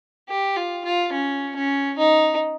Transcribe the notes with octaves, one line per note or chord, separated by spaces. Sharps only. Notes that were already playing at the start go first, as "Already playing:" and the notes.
G4
F4
F4
C#4
C#4
D#4